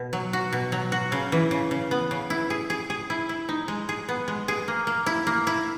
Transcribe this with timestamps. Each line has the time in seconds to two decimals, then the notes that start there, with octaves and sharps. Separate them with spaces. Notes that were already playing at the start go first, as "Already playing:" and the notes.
Already playing: B2
0.13 F#3
0.33 F#4
0.52 B2
0.72 F#3
0.92 F#4
1.12 C#3
1.32 E3
1.51 C#3
1.71 C#3
1.91 B3
2.11 C#3
2.30 E4
2.50 G#4
2.70 G#4
2.90 G#4
3.10 E4
3.29 E4
3.49 D#4
3.68 G#3
3.89 G#4
4.09 B3
4.28 G#3
4.48 G#4
4.68 A#3
4.87 A#3
5.06 E4
5.27 A#3
5.47 E4